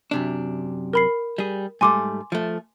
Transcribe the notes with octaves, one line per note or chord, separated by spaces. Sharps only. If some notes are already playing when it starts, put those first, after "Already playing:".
F#2 C3 D4
A#4 B5 C7
G3 G#4
G#2 G3 A3 G#5 C6 D6
F3 A3